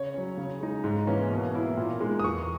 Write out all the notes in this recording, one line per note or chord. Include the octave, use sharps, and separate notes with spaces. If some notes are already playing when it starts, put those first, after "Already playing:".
Already playing: C#3 C#5
F#3 C#4
C#3
G#3 D#4
G#2
E3 A#3 C#4
B2
A#3 E4
A#2
G#3 D#4
D#6
E2 C#6